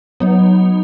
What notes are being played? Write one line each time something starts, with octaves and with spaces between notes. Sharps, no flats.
F#3 B3 D#4